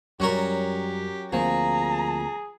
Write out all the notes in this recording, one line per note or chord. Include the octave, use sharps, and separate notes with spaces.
F#2 F#3 G3 C#4 G4 A#4
D2 F3 A#3 C4 G#4 A#5